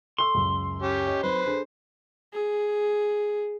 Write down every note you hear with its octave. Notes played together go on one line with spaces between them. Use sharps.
A4 C6 C#6 E6
C#2 F#2
C#4 G4
C#5 D#5
F#3 C4 D#4 B4 C5
D4 G#4 A4
G#4